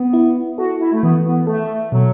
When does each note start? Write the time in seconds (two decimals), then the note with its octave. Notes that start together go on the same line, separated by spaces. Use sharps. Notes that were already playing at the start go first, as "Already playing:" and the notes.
Already playing: B3
0.13 E4
0.58 F#4 A4
0.81 E4
0.93 A3
1.03 E3 B3
1.25 B3
1.47 A3 A4
1.92 B2 F#3